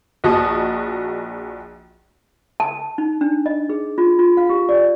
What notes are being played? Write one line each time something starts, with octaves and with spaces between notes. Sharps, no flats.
A#1 F#4 D#5 A5 D#6
A5
D#4
D4
D#5
G#4
F4
F4
F5
G4
D5